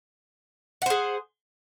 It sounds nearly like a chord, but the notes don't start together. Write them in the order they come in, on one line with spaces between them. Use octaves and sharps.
F#5 C5 G#4